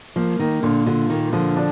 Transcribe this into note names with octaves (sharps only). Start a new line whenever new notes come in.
F3 A#3
D#3 A#3
A#2 D3
D3 F4
D#3 A#3
D3 F3
D4